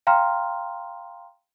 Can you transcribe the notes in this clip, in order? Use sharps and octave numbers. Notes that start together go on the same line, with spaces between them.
F5 G5 A#5 C6 F6